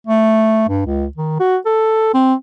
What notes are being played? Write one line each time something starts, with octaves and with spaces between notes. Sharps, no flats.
A3
G2
C#2
D#3
F#4
A4
C4